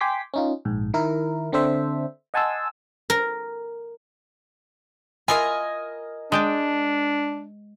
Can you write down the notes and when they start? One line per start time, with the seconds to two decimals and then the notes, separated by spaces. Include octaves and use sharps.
0.01 G5 G#5 C6 D6 B6
0.34 C#4 D#4 F4
0.65 A#1 G#2
0.94 D#3 E4 A#4
1.52 D3 C4 D4 A4 C5 E5
2.34 D#5 F#5 G#5 A5 C6 E6
3.10 A#4
5.28 E4 F4 A#4 D#5 G#5
6.32 G#3 D4 G5 A5